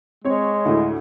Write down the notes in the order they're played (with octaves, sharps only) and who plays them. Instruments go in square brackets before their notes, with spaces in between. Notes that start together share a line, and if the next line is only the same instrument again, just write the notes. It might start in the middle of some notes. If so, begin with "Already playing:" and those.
[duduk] G#3 [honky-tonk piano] C4 C#5
[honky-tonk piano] D2 A2